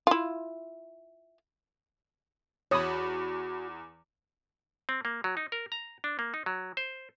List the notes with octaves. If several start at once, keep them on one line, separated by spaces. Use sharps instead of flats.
E4 F4
E2 F#4 C#5 B5 D#6
C4
A#3
F#3
D#4
A#4
A#5
D4
A#3
D#4
F#3
C5